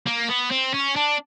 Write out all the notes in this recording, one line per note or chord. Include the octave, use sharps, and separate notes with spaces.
A#3
B3
C4
C#4
D4